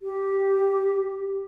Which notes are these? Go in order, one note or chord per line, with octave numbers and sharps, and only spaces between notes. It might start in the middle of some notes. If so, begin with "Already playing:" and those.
G4